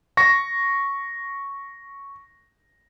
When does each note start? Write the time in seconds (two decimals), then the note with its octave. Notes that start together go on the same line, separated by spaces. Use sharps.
0.17 C#6 A#6